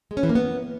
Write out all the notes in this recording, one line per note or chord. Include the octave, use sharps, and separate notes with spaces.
G#3
C#4
E3
A#3
B3